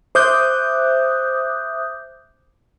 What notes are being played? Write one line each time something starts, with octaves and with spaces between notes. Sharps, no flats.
C5 E5 D6 D#6 F#6 G6